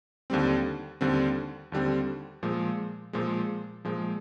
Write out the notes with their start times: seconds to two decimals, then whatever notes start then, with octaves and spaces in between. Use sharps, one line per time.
0.30 D#2 D3 G3 C4
1.01 D#2 D3 G3 C4
1.72 D#2 D3 G3 C4
2.43 A#2 F3 G#3
3.13 A#2 F3 G#3
3.85 A#2 F3 G#3